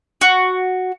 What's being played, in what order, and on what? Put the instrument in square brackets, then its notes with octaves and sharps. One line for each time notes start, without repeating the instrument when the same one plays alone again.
[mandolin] F#4